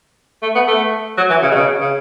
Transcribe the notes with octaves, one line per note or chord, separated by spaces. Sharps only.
A3
B3
A3
F#3
E3
C#3
B2
C#3
C#3